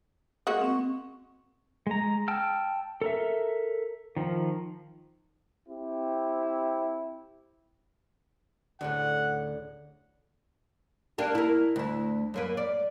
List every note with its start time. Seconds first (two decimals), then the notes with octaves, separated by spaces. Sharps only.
0.47 G#3 A#3 F#4
0.61 C4 C#6
1.87 G#3 A#5
2.28 G5 A5 E6 F6
3.02 A4 A#4 E5
4.17 D#3 F3
5.69 C4 E4 G4
8.81 D2 A2 C#3 D4 F#5
11.18 A#3 D4 G4
11.35 E4 A#4
11.76 D2 E4
12.34 F#2 A#3 B4
12.57 D5